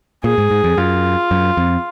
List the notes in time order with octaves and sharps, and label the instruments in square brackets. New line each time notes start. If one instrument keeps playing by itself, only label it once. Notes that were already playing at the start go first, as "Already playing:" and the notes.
[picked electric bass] A#2 [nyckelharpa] G#4
[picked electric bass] G#2
G#2
F2
[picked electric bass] F#2 [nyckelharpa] F4
[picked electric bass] F#2
F2